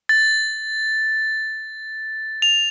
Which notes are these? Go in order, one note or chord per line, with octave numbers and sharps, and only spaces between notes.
A6
F7